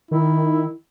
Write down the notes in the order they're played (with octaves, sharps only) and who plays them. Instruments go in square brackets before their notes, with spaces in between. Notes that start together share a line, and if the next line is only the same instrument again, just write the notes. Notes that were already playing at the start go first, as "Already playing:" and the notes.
[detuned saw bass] D#3 [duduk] E4